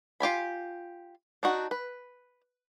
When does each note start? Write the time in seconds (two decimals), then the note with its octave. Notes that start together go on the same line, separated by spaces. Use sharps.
0.20 F4 G4 G#5 B5
1.43 D4 D#4 F#4
1.71 B4